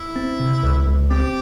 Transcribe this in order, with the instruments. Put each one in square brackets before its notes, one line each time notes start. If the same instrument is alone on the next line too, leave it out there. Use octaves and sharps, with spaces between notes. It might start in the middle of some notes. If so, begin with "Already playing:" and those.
Already playing: [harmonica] E4
[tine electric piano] C4
C3
C#2
C#2
[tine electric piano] C4 [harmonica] G4